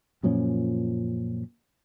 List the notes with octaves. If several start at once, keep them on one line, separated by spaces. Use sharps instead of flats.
F#2 A#2 F3 C#4